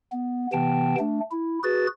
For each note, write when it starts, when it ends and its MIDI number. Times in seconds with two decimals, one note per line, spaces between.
0.12 0.47 59
0.53 0.95 48
0.53 0.95 52
0.53 0.95 59
0.53 0.95 79
0.53 0.95 81
0.99 1.20 57
0.99 1.20 62
1.32 1.59 64
1.63 1.87 66
1.63 1.87 68
1.63 1.87 71
1.63 1.87 93